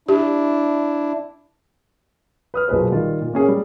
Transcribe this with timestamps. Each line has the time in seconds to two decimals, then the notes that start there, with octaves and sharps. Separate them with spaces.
0.09 D4 E4 G4
2.54 B4 D#6 F6
2.68 B1 A#2 G#4 B4 C5
2.92 D#3 G3 F4
3.21 A#2
3.33 A#3 C#4 G#4
3.49 G3